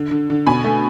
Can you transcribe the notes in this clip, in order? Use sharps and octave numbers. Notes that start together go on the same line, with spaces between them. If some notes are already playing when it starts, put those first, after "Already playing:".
Already playing: D3
D3
D3
B2 G#5 B5
A3